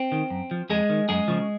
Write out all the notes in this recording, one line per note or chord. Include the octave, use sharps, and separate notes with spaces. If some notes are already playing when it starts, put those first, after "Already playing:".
Already playing: C4
D#3
F#2
F3
F2 G#3 G#4
D#3
F#2 G#3 G#4
C#3 F3